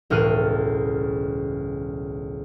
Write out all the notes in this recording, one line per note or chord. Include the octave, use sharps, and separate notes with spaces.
E1 C#2 A2 F6 F#6 D#7